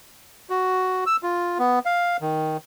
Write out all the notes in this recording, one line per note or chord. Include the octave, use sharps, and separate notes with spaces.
F#4
E6
F4
B3
F5
D#3